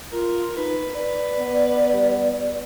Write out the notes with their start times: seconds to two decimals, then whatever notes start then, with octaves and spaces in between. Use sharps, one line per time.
0.12 F4 A#4
0.57 D#4 B4
0.95 B4 D5
1.39 B3
1.93 G3